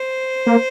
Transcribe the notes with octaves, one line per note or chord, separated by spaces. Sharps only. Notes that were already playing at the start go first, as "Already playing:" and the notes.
Already playing: C5
A#3